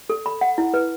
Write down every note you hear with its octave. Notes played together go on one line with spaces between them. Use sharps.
A4
B5
F#5
E4
B4